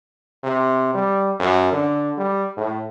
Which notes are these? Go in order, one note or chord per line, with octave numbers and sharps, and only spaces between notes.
C3
G3
F#2
D3
G3
A2